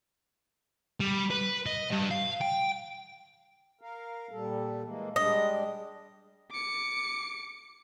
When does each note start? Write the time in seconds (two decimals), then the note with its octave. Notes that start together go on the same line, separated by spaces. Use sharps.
1.00 G3
1.31 B4
1.66 D#5
1.91 G2
2.11 F5
2.41 G5
3.81 A#4 F5
4.31 A#2 G3 A4
4.83 E3 G#3 A#3
5.16 G3 G#3 D4 D#5
6.51 D6 C#7